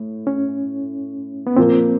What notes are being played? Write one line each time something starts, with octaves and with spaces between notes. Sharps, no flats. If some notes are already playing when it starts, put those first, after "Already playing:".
Already playing: A2
C#4
B3
A#2 F3 A#3 C4